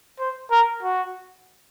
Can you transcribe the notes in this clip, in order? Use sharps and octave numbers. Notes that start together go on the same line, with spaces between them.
C5
A#4
F#4